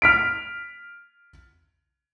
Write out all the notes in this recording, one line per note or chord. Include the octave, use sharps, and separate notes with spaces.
F6 B6 D7